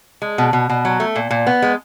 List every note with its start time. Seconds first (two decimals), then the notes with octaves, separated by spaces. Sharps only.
0.22 G#3
0.38 B2
0.53 B2
0.69 B2
0.85 F#3
1.00 A3
1.16 A#2
1.31 A#2
1.47 B3
1.62 G#3